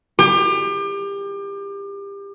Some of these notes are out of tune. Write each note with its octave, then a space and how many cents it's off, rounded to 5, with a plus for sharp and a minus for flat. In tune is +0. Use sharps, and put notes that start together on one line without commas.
G4 +30